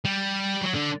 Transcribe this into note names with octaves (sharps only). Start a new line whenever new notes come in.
G3
F#3
D3